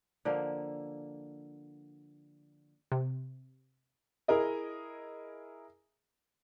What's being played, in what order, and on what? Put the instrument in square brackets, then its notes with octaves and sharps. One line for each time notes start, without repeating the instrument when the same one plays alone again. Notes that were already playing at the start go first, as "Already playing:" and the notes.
[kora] D3 F3 A#3
[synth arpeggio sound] C3
[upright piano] E4 G#4 A#4 D#5